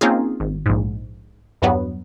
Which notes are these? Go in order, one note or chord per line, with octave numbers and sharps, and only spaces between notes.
A#3 C4 C#4 D#4 F4 G#4
G#1
A#1 G#2
E2 G2 F#3 B3